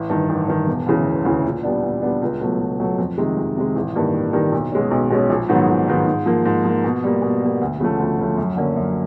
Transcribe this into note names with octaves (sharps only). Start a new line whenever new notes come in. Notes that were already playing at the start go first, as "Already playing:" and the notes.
Already playing: A1
G2 D#3
A1
G2 D#3
E1
D2 C#3 E3
E1
D2 C#3 E3
A#2
G3 B3 D4
A#2
G3 B3 D4
C#2
B2 F#3 A3
C#2
B2 F#3 A3
F2
C3 D#3 G#3
F2
C3 D#3 G#3
A1
G2 D#3 G3 A#3
A1
G2 D#3 G3 A#3
B1
B2 G#3 C#4
B1
B2 G#3 C#4
A#1
G#2 D#3 F#3 B3
A#1
G#2 D#3 F#3 B3
G#2
F3 A#3
G#2
F3 A#3
B2
G3 A#3
B2
G3 A#3
D2
C#3 F3 A3
D2
C#3 F3 A3
F#2
D3 F#3 A#3 C#4
F#2